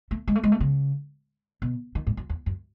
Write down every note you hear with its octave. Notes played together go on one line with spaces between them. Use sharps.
A3
G#3
A3
G#3
A3
C#3
B2
D#3
G#2
F#2
E2
F#2